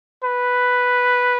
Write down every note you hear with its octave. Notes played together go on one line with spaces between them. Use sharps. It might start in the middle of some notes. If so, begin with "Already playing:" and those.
B4